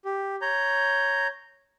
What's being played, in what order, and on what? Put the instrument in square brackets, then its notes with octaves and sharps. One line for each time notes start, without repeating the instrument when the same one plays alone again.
[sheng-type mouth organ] G4
C#5 A#5 G6